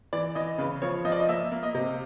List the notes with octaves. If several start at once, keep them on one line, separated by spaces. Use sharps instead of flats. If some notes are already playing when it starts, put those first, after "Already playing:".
E3 D5
E3 D#5
C#3 B4
F3 C#5
F3 D#5
D5
D#5
A#3 E5
A#3
D#5
C3